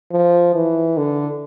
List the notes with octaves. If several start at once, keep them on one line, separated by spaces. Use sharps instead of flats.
F3
E3
D3